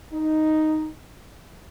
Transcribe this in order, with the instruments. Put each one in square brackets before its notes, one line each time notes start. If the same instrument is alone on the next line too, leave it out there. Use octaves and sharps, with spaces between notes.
[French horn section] D#4